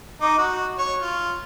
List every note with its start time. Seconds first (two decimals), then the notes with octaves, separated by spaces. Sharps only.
0.21 D#4 D6
0.38 F#4
0.78 C#5 C#6
1.01 F4